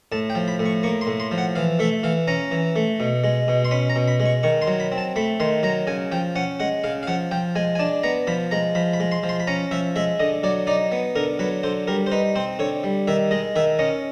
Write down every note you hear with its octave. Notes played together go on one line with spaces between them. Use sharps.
A2 A5
G5
F3
B5
A2
C#6
A#3 C#6
C6
A2
C6
F3
F#5
E3 F5
A3 E5
E3 F5
C#4 A#5
E3
A3
B2
G#3
B2
C6
C#4 B5
A#5
B2
B5
G#3
C#6
D#3 C#6
C6
F#3
B5
C4
A5
A3 B5
D#3 C6
F#3 A#5
C#3 G#5
F3 G5
C#4 F#5
G#3 F#5
C#3 F5
F5
F3 F#5
F3 G5
G#3 G#5
G#5
D4 A5
B3 A#5
F3 B5
G#3 A#5
F3 B5
B5
G#3
C6
F3
C6
B5
C#4 A#5
F3 E5
G#3 E5
D3 D#5
F#3 D5
D#4 D5
B3
D3 A#4
F#3 B4
D3 C5
G3 A#4
C5
D#4 B4
C4 C5
D3 C#5
G3
D#3 E5
G#3 D#5
D#3 E5
C#4 D#5